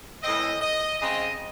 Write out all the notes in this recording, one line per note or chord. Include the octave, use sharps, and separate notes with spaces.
A2 E3 C4 D#5
D#5
C#3 G#3 C4 D#5